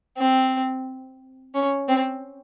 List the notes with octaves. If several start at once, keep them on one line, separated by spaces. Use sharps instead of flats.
C4
C#4
C4